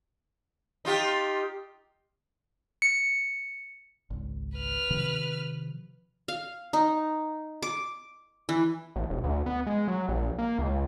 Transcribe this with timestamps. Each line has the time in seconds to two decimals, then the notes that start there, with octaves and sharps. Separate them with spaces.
0.85 D#4 F4 G4
2.82 C#7
4.10 G#1 C#2
4.57 B4 F6
4.90 C3 D#3 F3
6.28 F5
6.73 D#4
7.62 D6
8.49 E3
8.96 A1
9.10 E1
9.24 D2
9.46 B3
9.67 G#3
9.88 F#3
10.09 A#1
10.39 A#3
10.59 C#2